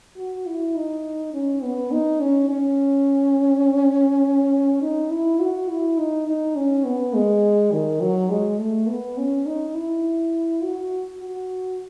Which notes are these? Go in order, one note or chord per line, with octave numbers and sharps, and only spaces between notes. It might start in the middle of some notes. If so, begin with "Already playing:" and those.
F#4
E4
D#4
C#4
B3
D#4
C#4
C#4
D#4
E4
F#4
E4
D#4
D#4
C#4
B3
G#3
D#3
F#3
G#3
A3
B3
C#4
D#4
E4
F#4
F#4